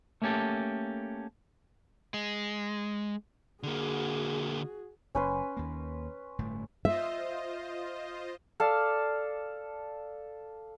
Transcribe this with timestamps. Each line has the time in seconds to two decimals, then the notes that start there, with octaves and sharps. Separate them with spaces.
0.22 A3 A#3 C#4 G4 A4
2.14 G#3
3.63 D3 A#3 F#4 G#4
5.15 F#1 C#4 B4 C6
5.57 D#2 A#3
6.39 G1 A2 A3
6.85 F4 C5 D#5 E5
8.60 A4 D5 F5 A5